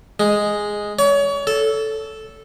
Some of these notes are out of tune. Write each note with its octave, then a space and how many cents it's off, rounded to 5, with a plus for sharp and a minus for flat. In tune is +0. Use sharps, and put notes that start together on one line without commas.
G#3 +0
C#5 +35
A4 -5